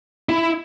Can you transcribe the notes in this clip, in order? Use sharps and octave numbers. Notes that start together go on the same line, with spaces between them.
E4